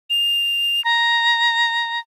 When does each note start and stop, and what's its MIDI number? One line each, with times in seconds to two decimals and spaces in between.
0.10 0.83 101
0.85 2.00 82